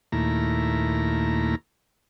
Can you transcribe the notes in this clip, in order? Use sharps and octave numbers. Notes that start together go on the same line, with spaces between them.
D#2 A#2 A3 E4 A#5